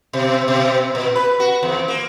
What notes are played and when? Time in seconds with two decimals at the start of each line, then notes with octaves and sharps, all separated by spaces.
0.13 B2
0.48 B2
0.95 A#2
1.15 B4
1.40 F#4
1.63 E2
1.88 A#3